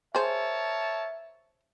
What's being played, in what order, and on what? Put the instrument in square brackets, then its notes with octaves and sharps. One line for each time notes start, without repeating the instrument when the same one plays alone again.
[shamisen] G#4 C5 [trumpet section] A#4 C#5 A5 [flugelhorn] E5